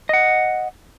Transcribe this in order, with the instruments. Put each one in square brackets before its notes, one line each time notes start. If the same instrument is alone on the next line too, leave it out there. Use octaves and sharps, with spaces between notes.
[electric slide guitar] D#5 F#5